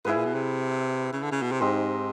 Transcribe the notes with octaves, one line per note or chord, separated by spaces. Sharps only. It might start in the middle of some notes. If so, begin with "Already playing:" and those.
G#2 E4 G#4 B4
A#2
B2
C3
C#3
D3
C#3
B2
C3
G#2 C4 D#4 G4